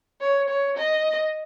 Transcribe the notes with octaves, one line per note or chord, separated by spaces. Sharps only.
C#5
C#5
D#5